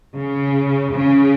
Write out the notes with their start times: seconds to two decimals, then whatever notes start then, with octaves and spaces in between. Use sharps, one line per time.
0.16 C#3
0.93 C#3